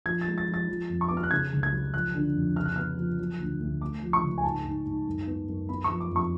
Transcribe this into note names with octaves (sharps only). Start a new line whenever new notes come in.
F3 G#6
A6
G#3
A6
F3
A6
F3
F2
C#6
B3 D6
F6
F#6
C#3 G#6
C#2
G#6
F#3
F3 F#6
D3
F2
C#3 F6
F#6
B3 F6
F3
F#3
D2
D2
A3 D6
F3
C#6
C#2
G#5
G#2 A5
G#2
G#2
F#2
B3
F#2
B3 B5
C#6
F3
D6
F2 C#6